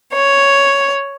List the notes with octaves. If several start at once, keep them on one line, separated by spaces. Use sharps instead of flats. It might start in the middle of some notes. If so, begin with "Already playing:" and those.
C#5